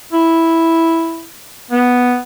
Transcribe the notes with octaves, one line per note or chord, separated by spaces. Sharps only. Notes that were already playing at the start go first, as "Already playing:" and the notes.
E4
B3